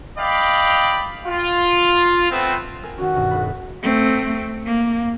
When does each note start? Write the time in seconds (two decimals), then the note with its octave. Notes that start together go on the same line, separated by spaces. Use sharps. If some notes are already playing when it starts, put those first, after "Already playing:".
0.18 D5 D#5 F5 G5 B5
1.26 F4
2.31 A3 B3 C4
2.83 A#4 G#5 E6
2.98 D#3 C#4 F#4
3.14 G2 B2 D#3
3.29 D#1 B5 A6
3.82 A3 C4
4.66 A#3